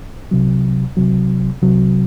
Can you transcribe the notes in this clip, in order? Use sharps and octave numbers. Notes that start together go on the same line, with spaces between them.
C2 C3 F#3
C2 C3 F#3
C2 C3 F#3